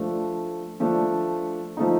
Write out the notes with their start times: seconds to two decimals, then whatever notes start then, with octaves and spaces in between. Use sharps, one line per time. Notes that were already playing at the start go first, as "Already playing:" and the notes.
Already playing: F3 A3 D4
0.80 F3 A3 D4
1.77 F3 A3 D#4